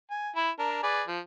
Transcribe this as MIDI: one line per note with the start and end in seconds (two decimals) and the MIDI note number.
0.11 0.30 80
0.36 0.50 64
0.36 0.50 83
0.59 0.82 62
0.59 0.82 70
0.83 1.02 68
0.83 1.02 71
0.83 1.02 74
1.07 1.19 53